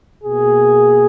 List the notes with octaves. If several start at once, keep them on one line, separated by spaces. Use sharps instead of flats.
B2 A#3 G#4